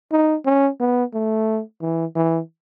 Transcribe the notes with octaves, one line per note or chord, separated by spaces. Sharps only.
D#4
C#4
B3
A3
E3
E3